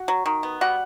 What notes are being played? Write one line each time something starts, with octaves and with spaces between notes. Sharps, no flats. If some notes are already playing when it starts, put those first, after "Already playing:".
Already playing: F#4 F#5
F#3
D#3
B3
G3 F#4 F#5